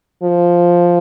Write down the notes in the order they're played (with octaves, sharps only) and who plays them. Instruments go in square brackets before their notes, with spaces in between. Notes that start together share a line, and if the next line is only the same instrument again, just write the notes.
[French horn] F3